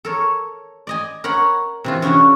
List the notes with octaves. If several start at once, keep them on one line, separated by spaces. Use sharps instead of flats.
A4 A#4 C#5
D5 D#5 G#5
A#4 C#5 F#5 B5
C3 E3 F4
C#3 C#4 D4 E4 F#4